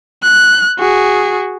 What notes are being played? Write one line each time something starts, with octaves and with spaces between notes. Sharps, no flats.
F#6
F#4 G#4